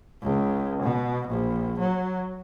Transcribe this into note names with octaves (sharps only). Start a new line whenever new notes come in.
C#2
B2
A#1
F#3